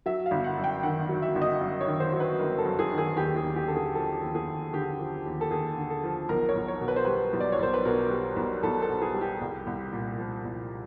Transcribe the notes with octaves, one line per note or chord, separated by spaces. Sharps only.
F#3 E5
F5
G1
F#5
F#2
G5
D#3 F#5
F#3
E5
G1
D#5
F#2
C#5
D#3
C5
F#3
B4
G1 A#4
A4
F#2
G#4
D#3
G#4
D#2 G4
G#4
D#2
G4
D3 A4
G#4
F3 A4
D#2
G#4
D#2
D3 G4
F3
D#2
A4
D#2 G#4
D3
A4
F3
B1 A#4
C#5
B1
C#5
B2
B4
C5
G3 B4
B1
D5
C#5
B1 C5
B4
B2 A#4
G3
B1
B1 A4
A4
B2
G#4
G3
G4
C2
C2
A#2
F3
C2